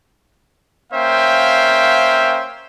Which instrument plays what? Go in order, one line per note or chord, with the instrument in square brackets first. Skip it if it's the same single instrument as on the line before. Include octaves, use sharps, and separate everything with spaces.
[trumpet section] A#3 C#4 C5 E5 F5 G5